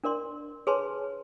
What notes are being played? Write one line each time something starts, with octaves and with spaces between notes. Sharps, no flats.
D4 A#4 D5 C6
G#4 B4 C#5 G#5 A5 C6